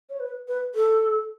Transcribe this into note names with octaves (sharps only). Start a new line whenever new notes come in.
C#5
B4
B4
A4